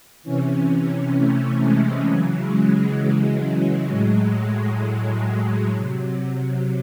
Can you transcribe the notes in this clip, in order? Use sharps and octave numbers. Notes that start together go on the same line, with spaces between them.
C3 E3 C#4
A3
G#3
C#3 E3 F#3
G#3
F#3
G#3
A2 F#3
F#3
C3 F#3